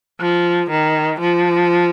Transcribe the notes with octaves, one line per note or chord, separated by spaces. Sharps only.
F3
D#3
F3